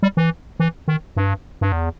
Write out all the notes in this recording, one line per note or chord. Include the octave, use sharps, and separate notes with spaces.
G3
E3
E3
D#3
G2
G2
E2